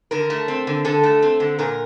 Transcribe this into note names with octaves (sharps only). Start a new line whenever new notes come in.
D3 A#4
A3
C4
D3
D3 A4
A3
C4
D3
A#2 A#4